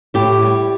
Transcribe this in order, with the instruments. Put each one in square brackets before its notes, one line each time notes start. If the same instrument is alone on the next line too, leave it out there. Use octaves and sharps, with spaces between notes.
[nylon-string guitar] A2 E4 G4
G3